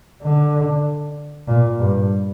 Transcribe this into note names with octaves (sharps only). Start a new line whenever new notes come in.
D3
A#2
G2